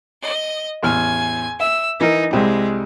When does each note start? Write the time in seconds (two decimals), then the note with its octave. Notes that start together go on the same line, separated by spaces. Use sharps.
0.21 D#5
0.83 A1 E2 G#5 F6
1.60 E5 E6
2.01 E3 D#4 A#4
2.33 C2 G3 G#3 C4